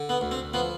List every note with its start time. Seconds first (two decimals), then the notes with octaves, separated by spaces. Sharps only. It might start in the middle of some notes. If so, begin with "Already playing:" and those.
Already playing: D3
0.09 B3
0.21 D2
0.31 C4
0.54 F3 B3